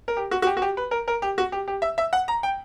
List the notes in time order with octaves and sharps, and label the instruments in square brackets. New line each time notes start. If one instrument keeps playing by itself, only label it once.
[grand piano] A#4
G4
F#4
F#4
G4
F#4
G4
B4
A#4
A#4
G4
F#4
G4
G4
E5
E5
F#5
A#5
G5